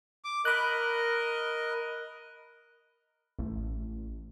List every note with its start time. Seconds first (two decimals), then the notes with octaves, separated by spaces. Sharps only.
0.24 D6
0.45 A#4 D#5 B5 F#6
3.39 A1